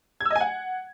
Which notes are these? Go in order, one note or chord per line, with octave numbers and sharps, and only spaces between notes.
G#6
E6
D#5
G#5
F#5